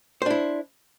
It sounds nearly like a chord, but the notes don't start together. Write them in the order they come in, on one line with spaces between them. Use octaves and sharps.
C5 D4 E4